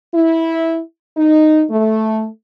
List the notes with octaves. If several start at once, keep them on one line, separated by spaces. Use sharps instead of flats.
E4
D#4
A3